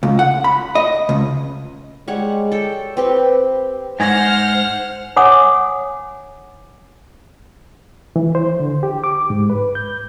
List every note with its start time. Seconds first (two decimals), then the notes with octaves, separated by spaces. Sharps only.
0.03 C#2
0.19 F#5
0.44 B5
0.75 D#5
1.09 C#2
2.08 G3 G#3 C#5 F#5
2.52 A4 G5
2.97 C4 G4 B4 C6
4.00 G#2 C5 F#5 G#5 F6 G#6 A#6
5.16 C#5 F#5 G#5 D6 D#6
8.16 E3
8.35 C5
8.60 D3
8.83 G4
9.04 D6
9.30 G#2
9.50 B4
9.75 G6